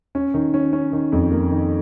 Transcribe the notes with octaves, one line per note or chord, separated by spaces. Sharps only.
C#4
D#3
C#4
C#4
D#3
F2
A#3
D#3